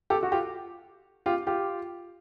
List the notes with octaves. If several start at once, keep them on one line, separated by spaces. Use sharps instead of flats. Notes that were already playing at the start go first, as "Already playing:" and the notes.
G4 A4
F#4
F4 G4
F4 G4
F4 G4